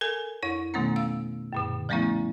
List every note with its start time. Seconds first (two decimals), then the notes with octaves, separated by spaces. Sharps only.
0.01 A4 A#4 G#5
0.43 F2 E4 C#5
0.74 B2 D#3 A3 B3 C#4
0.96 F5 E6
1.53 F#2 A#2 D3
1.89 F3 G3 A3 B3 C#4 E4